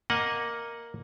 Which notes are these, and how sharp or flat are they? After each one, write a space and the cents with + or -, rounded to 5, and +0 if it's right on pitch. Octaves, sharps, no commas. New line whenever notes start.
A#3 +0 D#5 +0 F#5 -15